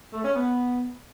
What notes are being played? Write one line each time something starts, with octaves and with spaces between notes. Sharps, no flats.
A3
C#4
B3